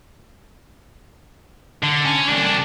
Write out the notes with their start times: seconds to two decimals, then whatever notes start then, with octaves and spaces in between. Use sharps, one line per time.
1.83 D3
2.05 C#4
2.29 C2 D4